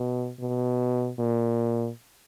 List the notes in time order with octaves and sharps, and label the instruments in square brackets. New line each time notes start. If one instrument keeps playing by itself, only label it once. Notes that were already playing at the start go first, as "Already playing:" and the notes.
Already playing: [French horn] B2
B2
A#2